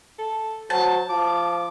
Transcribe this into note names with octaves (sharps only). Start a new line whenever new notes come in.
A4
F#3 C5 A5
F3 D6